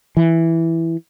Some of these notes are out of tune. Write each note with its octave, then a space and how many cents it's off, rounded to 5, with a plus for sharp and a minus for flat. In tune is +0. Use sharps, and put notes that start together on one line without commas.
E3 +0